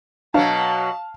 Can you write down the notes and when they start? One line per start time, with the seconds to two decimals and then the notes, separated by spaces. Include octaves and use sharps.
0.34 B2 F#3 D4 F5 A5